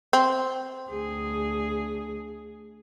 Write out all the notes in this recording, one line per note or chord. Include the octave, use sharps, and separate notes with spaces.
C4
D2 G#4